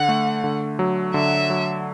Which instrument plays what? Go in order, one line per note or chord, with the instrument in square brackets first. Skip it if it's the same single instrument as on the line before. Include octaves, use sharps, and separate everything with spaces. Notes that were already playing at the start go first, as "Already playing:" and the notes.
Already playing: [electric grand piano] D3 [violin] F#5
[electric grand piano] A3
D3
F#3
[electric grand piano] D3 [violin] E5
[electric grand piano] F#3